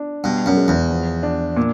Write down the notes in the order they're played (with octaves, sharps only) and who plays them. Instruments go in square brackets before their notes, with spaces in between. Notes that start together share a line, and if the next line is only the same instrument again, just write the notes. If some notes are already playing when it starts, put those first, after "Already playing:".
Already playing: [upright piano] D4
[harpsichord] G2 [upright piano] B2
[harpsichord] F#2
[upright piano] G#3
[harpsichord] E2
[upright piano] F3
D4
A#2